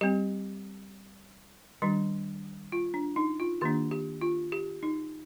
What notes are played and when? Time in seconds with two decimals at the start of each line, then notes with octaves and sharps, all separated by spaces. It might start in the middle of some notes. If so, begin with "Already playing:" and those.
0.01 G3 C4 G4
1.82 D#3 G3 D4
2.72 F4
2.94 D4
3.16 D#4
3.40 F4
3.61 D#3 A#3 D4 G4
3.91 G4
4.21 F4
4.52 G4
4.83 D#4